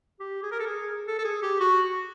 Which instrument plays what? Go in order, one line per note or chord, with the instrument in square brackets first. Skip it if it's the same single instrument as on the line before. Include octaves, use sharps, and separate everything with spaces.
[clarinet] G4
G#4
A#4
A4
G#4
A4
A4
G#4
G4
F#4